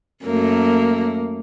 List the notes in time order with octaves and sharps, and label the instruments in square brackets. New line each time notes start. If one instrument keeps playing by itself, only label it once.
[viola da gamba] F#2 A3 [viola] A#3